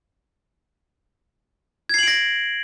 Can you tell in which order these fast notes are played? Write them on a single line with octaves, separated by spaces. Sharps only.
G#6 C7 F#7 D7 A#6